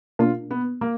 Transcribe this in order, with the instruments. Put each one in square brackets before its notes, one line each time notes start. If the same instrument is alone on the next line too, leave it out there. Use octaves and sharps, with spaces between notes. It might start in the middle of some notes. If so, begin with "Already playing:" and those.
[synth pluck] B2 A#3 D4 [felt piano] F4
[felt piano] B3
A#3